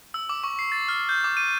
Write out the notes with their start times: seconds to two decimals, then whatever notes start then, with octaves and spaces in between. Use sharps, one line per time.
0.14 E6
0.29 D6
0.44 C#6
0.59 C7
0.72 A6
0.89 F6
1.09 G6
1.24 D6
1.37 D#7